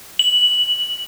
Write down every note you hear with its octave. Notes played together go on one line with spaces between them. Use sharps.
F#7